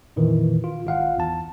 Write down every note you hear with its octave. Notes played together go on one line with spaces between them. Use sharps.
F2 A#2 D#3 E3
F4
G#1 F4 F5 F#5
E2 A5